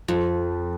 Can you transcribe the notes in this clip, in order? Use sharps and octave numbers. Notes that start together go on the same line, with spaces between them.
F2 F3